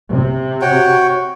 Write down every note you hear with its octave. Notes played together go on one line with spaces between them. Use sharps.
C3
F#4 C#5 G5